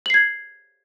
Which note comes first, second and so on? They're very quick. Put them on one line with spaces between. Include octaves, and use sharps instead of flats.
F#7 C7 G#6